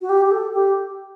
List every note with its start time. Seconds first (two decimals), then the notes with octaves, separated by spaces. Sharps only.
0.01 F#4
0.09 G4
0.25 G4
0.32 A4
0.54 G4